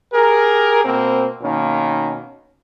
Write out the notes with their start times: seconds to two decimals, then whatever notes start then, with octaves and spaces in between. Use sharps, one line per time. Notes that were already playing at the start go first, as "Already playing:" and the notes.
0.13 G4 G#4 A#4
0.85 B2 A#3 C4
1.42 B2 D#3 A#3 C#4